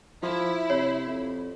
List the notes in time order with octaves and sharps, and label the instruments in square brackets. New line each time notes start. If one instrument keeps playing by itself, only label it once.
[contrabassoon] F3 [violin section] E4
[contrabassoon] C3 [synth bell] C#5
[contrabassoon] F2